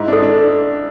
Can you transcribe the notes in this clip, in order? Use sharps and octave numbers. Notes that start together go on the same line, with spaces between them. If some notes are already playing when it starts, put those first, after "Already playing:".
Already playing: G#2 E4
D4 A4
D4